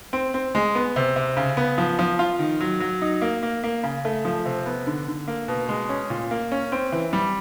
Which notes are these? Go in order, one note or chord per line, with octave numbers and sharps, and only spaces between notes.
C4
C4
G#3
B3
C3
C3
C#3
B3
F3
F3
F4
D#3
F#3
F#3
D#4
A#3
A#3
A#3
C#3
A3
F3
C3
B3
D3
D3
A#3
B2
G#3
C#4
A#2
A#3
C#4
C4
E3
G3